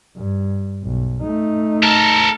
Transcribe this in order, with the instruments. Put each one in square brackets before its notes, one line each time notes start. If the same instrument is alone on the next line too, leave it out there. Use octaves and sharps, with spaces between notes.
[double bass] G2
B1
A3 D#4
[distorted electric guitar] A4 A#4